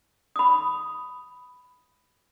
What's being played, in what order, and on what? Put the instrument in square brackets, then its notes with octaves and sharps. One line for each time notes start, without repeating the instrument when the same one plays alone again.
[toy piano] B5 D#6